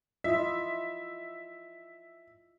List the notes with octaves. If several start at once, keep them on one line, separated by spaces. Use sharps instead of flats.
E4 F4 D#5 E5